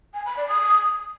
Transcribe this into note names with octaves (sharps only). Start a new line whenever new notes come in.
G#5
B5
D5
D#6